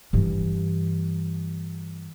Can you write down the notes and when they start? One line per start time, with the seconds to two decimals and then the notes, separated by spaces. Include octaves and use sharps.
0.13 G2 E3